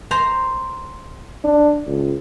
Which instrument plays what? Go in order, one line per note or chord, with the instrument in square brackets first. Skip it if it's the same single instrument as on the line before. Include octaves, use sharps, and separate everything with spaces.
[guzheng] C5 A#5
[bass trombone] D4
C#2